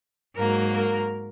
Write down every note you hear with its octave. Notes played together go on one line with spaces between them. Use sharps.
G#2 F#3 A#3 A#4
A#4